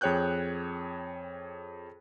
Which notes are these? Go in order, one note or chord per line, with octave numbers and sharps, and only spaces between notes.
F2 G#4 C#5 G5 F#6 G6